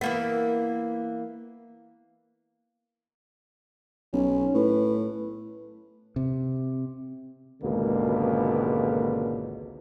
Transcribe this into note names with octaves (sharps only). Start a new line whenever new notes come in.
E3 A#3 B3
B1 C#4
A2 B4
C3
G#1 C#2 B2 D3 A#3